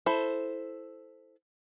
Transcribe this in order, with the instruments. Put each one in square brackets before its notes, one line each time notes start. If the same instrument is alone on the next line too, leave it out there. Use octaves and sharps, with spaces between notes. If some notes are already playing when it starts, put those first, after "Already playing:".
[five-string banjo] E4 A4 C5